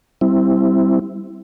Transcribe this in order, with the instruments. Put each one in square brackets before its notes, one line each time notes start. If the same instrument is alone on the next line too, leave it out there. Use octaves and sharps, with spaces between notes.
[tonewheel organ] G3 C4 E4